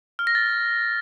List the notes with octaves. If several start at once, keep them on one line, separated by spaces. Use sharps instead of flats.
F6
A#6
A6